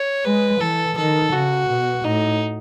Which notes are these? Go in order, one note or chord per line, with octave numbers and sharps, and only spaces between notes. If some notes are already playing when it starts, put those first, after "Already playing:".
Already playing: C#5
G#3 B4
E3 A4
D#3 A4
C#3 F#4
B2
A2 D#4